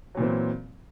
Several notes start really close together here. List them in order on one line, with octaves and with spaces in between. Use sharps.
F#3 A#2 E3 C4